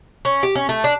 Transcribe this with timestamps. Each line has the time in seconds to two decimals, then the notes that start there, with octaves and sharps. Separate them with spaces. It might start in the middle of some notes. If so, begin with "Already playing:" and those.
0.25 C#4
0.43 G4
0.55 C#4
0.69 A3
0.84 D4